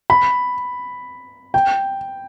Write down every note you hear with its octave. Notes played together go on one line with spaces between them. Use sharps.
B5
G5